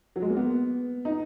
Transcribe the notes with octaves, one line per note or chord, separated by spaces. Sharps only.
F#3
G#3
A#3
B3
D#4